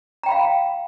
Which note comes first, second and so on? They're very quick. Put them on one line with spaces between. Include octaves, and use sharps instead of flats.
A#5 G5 B5 F5